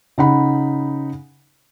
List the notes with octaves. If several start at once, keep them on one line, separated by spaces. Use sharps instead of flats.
C#3 D#4 F#5 B5